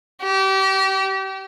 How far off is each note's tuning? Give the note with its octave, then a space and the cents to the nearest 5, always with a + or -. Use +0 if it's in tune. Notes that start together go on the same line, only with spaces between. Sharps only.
G4 -30